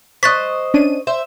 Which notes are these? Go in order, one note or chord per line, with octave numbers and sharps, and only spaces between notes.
C5 D#5 C#6 D#6 F#6 A6 B6
C#4 D4 D#7
C5 E5